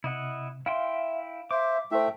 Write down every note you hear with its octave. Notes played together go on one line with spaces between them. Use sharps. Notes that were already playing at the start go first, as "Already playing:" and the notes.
C3 E4 D#5 F#5
E4 E5 F5 G5 C6
C5 E5 D6
A3 E4 C5 E5 G5